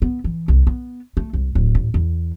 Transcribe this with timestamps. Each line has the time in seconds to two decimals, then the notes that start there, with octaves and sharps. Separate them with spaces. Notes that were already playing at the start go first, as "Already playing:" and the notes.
0.02 B3
0.24 E3
0.48 C2
0.67 B3
1.17 A3
1.33 C2
1.55 D1
1.75 A1
1.94 E2